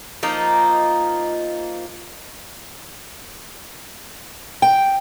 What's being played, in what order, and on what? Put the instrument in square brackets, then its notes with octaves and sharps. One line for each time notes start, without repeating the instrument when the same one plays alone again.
[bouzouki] F3 A#3 D#4
[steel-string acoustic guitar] G5